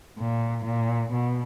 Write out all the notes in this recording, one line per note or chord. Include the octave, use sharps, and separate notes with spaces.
A#2
A#2
B2